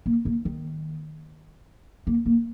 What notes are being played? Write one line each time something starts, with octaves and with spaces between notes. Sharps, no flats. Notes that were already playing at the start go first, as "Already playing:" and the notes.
A#3
A#3
D#3
A#3
A#3